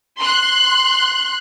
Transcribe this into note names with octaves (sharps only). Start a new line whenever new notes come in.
C6 F#6